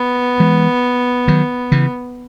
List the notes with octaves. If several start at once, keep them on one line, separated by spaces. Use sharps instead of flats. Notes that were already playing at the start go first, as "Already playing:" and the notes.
Already playing: B3
E3 G#3
D#3 F#3
C#3 E3